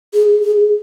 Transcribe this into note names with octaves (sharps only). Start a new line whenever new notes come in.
G#4
G#4